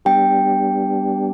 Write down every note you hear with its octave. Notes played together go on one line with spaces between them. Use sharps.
G3 B3 D4 G4 G5